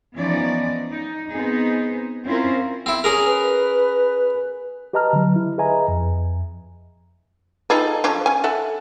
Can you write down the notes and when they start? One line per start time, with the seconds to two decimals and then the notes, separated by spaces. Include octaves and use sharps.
0.15 E3 F3 B3 C#4 D#4 D5
0.90 D#4
1.29 B3 C4 D#4 G#4
2.24 C4 C#4 E4 F4 A#4 C5
2.86 C4 E4
3.04 C#4 G#4 A#4
3.26 B4
4.93 G4 B4 D#5 A5 A#5 F6
5.13 D3 F#3
5.36 E4
5.58 G#4 B4 D#5 E5 G#5 A#5
5.88 F2
7.70 G3 D#4 F4 G#4 A4 B4
8.04 F3 C#4 D4
8.26 C#4 G#5
8.44 A4 E5 F#5